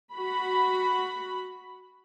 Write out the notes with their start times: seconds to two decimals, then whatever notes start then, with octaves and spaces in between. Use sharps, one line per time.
0.13 F#4 B5